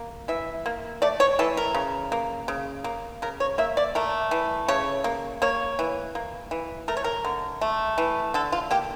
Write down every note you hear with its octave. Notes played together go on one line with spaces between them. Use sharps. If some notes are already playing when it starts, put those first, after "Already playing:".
Already playing: A#3
E3 E5
A#3
A3 D5
C#5
E3 A4
A#4
C#3
A#3
C#3
A#3
C#3 A#4
C#5
A#3 E5
D5
A3 A#4
E3
C#3 C#5
A#3
A#3 C#5
E3
A#3
E3
A3 A#4
C#5
A#4
D3
A3
E3
D3 A4
F4
A#3 G4